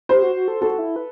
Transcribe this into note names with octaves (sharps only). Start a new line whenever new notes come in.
G4 C5
F#4
F#4
A4
F#4 A4
E4
B4